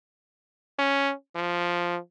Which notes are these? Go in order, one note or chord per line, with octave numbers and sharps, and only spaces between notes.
C#4
F3